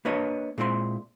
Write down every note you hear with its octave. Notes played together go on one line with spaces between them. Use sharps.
A#3 D4 B4 C#5 D#5
A#2 G#3 C4 E4 D5 C6